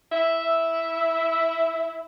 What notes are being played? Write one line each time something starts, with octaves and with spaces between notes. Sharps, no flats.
E4 E5